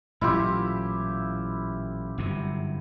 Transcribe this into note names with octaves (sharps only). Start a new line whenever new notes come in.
A1 A#2 F#3 E4 F4 G4
G1 F#2 C3